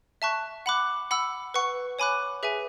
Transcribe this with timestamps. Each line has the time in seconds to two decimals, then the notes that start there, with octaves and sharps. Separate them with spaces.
0.22 E5 A5 C#6 F#6
0.66 F#5 B5 D6 F#6
1.11 F#5 B5 E6
1.54 B4 F#5 C#6
1.99 C#5 G#5 B5 D6 F#6
2.43 G#4 B4 E5 G#5